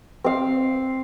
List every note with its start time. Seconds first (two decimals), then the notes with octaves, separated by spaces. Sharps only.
0.24 C4 F5